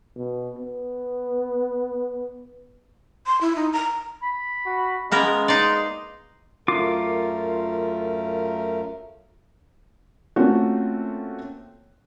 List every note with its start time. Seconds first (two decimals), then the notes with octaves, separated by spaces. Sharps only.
0.16 B2
0.58 B3
3.26 C6
3.41 E4
3.56 D#4
3.73 A#5
4.22 B5
4.66 F#4
5.12 G#3 A#3 B3 C#4 A#4
5.48 D#4 D5 C6
6.68 F#2 A3 F4 A#4 D6
10.36 A3 A#3 C4 C#4 F4 F#4